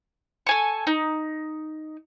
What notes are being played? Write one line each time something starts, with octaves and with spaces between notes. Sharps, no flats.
A4 G#5 C#6
D#4